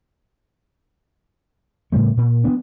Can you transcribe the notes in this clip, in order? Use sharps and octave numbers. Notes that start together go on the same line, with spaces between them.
A2 C#3 G3 A3
A#2
F3 F#3 B3 D4